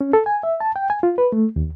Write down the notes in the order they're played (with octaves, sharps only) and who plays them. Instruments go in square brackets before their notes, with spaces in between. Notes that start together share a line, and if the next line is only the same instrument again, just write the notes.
[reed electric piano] C#4
A4
G#5
E5
A5
G5
G#5
F4
B4
A3
D#2